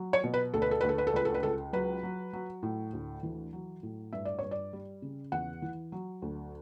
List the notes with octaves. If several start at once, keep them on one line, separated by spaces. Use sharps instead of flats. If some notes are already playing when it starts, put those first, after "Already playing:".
Already playing: F#3
C#5
B2
B4
D2 A4
B4
A4
D2 B4
A4
B4
A4
C#2 B4
A4
B4
C#2 A4
F#3 B4
F#3
F#3
A2
D2
E3
F#3
A2
G2 E5
D5
G2 C#5
D5
G3
C#3
E2 F#5
E3
F#3
D2